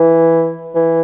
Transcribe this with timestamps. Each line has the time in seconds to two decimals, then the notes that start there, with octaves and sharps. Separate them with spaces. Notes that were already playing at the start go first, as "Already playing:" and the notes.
Already playing: E3
0.75 E3